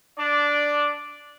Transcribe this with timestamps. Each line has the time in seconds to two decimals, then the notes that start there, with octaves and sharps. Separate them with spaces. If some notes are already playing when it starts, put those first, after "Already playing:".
0.19 D4 D5